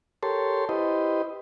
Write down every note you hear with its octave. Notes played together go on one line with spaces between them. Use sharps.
G4 A4 A#4 C#5 A5 C6
E4 G4 B4 C5 D#5